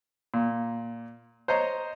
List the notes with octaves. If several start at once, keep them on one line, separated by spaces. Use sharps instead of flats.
A#2
C5 C#5 D#5 A#5